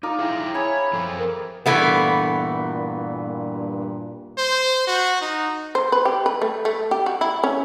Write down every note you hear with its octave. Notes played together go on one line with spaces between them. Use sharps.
D#4 F4 A#4 D5
E4 G#4 E5 G5
G#4 C#5 E5 G#5 B5
F3 A4 C5
A#4
G2 A#2 E3 A3 B3
C5
F#4
D#4
C5
B4
G4
B4
A3
A3
G4
F#4
E4
C#4